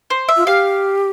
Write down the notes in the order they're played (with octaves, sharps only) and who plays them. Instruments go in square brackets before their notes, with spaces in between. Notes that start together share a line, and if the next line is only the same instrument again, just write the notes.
[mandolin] C5
E5
[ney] F4
[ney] G4 [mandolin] F5